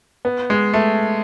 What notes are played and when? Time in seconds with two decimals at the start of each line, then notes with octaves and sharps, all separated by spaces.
0.25 B3
0.50 G#3
0.73 A3